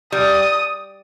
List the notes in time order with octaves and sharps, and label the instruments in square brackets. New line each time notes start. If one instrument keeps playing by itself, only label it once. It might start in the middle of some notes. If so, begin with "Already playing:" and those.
[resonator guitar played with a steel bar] G3 [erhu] D#6